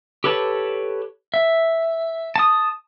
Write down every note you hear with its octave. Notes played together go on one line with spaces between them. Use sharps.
G4 A4 B4 C#5 A5
E5
A5 D#6